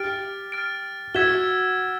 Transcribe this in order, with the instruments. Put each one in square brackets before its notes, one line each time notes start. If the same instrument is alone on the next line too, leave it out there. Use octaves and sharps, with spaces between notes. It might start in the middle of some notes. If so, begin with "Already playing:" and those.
Already playing: [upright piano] G4 [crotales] F6 A6 D7
[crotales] F6 A6 D7
[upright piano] F#4 [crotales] E6 G#6 B6 E7 G7